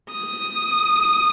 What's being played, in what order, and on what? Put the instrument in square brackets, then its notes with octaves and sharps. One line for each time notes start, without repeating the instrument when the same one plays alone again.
[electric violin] D#6